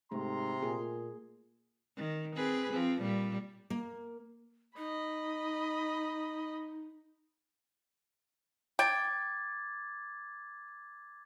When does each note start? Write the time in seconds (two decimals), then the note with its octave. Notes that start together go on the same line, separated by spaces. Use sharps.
0.12 G#2 C3 A3 A#5 C6
0.63 A#2 G#4
1.97 D#3
2.36 C4 G#4 B4
2.72 F3 C4
3.01 A#2 G3
3.70 A#3
4.77 D#4 D#5 B5
8.79 G5 D6 G#6 A6